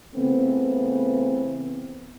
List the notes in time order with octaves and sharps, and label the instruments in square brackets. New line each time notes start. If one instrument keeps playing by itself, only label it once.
[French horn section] C#3 E3 A3 B3 C4